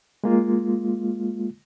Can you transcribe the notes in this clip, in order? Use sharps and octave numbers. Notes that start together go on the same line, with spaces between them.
G#3 A#3 F4